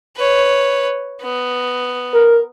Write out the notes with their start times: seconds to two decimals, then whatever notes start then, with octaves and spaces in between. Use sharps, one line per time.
0.16 B4 C#5
1.21 B3
2.14 A#4